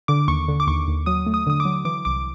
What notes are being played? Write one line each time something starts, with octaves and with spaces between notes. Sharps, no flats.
D3 D6
D#2 C#6
D3
D6
D#2 C#6
D#2
F#3 D#6
A3
D#6
D3 D#6
D6
F#3
E3 D6
C2 D6